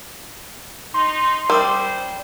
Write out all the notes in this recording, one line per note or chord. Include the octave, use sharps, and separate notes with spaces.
D#4 C6
G3 C#4 A#4 C5 D6 D#6